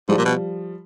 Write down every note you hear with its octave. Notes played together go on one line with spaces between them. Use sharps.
G#2 F3 G3
A#2
B2